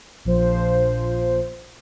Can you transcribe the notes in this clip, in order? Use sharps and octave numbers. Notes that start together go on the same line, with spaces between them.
A#1 F3 C5